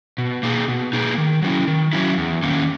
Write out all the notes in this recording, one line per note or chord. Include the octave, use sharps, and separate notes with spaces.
B2
A#3 D#4 G#4
B2
A#3 D#4 G#4
D#3
F#3 C#4 E4
D#3
F#3 C#4 E4
E2
D#3 A#3 C#4